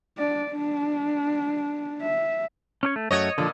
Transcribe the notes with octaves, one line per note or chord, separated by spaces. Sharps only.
D4 D5
D4
E5
C#4 D4 C#5
A3
F#2 A3 F#4 C#5 D#5
A#2 D3 F3